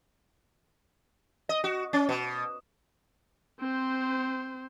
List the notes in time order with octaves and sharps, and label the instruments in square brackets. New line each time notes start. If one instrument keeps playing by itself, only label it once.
[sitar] D#5
F#4
C#4
B2
[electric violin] C4 C5